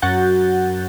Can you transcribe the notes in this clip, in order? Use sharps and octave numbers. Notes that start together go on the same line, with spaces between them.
F#2 F#4 F#5 G6 A6